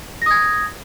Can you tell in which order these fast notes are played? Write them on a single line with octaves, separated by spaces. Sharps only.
A#6 D#6 G#6